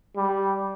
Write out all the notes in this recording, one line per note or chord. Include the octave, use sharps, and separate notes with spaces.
G3